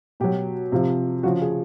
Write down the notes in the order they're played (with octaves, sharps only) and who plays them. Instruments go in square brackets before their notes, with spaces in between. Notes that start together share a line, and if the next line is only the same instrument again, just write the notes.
[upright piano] B2 F#3 G4
C3 F3
C#3 F3 F#4
G#4